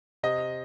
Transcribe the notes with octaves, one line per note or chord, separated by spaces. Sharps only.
C3 D#5